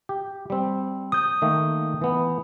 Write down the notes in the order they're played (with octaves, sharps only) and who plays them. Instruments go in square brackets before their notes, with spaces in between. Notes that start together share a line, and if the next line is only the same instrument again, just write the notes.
[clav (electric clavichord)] G4
G3 C4
[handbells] D#6 G6
[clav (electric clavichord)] D#3 A3 A#3
E3 B3